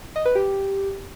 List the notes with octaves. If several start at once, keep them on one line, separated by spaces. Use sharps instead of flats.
D#5
B4
G4